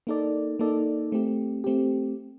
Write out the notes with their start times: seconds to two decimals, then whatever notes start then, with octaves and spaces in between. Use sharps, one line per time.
0.07 A#3 D#4 A4 D5
0.59 A#3 D#4 A4 D5
1.12 A3 C4 G4
1.64 A3 C4 G4